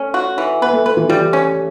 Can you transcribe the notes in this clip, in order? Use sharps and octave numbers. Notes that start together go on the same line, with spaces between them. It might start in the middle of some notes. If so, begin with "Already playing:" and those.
Already playing: A3 C#4
F#4
E3
B3 B4
A3
A3 B4
E3
E3 G3
C#4